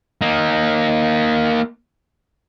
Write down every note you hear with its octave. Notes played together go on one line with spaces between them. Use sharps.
A#3 D#4